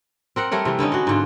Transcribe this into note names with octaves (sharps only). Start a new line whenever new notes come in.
C4 A#4 F#5
G3 A3 A#4 C#5
C3 E3 G3
D3 B3 C#4 D#4
G#3 F#4
G#2 D3 F4